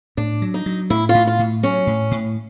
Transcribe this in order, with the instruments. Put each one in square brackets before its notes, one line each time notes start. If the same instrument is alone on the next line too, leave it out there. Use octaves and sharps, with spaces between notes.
[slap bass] A2 [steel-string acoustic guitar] D4
[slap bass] F#3
[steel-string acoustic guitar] D#4
[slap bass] F#3
[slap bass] A2 [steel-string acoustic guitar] E4
[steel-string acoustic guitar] F4
[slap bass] A2
[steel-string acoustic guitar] F4
[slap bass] A2
[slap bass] F#3 [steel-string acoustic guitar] C#4
[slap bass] A2
A2